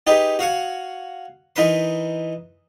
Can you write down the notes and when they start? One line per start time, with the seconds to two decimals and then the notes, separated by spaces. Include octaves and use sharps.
0.07 D#4 G4 G#4 B4 D#5
0.39 F#4 F5 F#5 G#5
1.56 E3 D#4 A#4 B4 C6